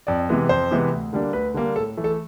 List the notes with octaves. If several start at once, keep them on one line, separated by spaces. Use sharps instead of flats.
F2 D5
C3 E3 G#3 B3
F2 C5
C3 E3 G#3 B3
D2
D3 G3 A#3 D4
D2 B4
D3 G3 A#3 D4
A2 A4
E3 A3
A4